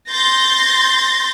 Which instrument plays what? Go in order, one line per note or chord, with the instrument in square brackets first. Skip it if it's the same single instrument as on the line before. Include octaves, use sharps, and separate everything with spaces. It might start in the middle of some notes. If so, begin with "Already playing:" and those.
[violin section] C6 G6 A6 A#6